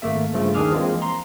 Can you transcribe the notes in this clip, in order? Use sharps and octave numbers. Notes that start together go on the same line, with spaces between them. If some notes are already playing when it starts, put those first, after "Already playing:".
G#1 A3 A#3 E5
G2 C#3 F3 A3
D#2 D#3 D4 G#4 D6 F6
E3 F3 G#3 A#3 C4
A#5 C6